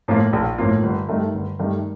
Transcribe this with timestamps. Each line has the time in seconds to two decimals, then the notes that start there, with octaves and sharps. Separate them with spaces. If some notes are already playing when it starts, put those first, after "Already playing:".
0.08 A2 F3 A#3 F4
0.33 A#1
0.58 A2 F3 A#3 F4
0.83 G1
1.09 G2 D#3 A3
1.34 G1
1.59 G2 D#3 A3